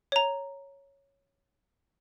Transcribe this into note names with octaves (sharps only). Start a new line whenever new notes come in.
C#5 A#5